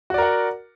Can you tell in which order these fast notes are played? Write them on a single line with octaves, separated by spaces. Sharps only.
F#4 D5 A#4 F#5